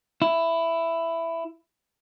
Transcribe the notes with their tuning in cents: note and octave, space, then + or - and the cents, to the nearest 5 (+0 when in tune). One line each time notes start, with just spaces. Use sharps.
E4 +10